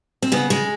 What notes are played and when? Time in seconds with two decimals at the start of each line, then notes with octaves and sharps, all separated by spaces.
0.22 C4
0.32 C#3 B3
0.50 G#3